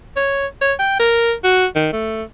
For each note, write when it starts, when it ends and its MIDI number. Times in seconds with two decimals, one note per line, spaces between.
0.17 0.47 73
0.62 0.74 73
0.79 0.95 79
1.00 1.34 70
1.44 1.66 66
1.76 1.90 51
1.93 2.23 57